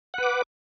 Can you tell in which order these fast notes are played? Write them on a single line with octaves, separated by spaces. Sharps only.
F#5 B4 D6